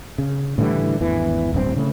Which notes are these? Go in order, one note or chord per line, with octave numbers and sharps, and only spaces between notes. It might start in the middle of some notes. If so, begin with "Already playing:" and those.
C#3
A2 D3 E3 G3
G#1 E2 E3
D1 G2 A#3 C4
C#3 A3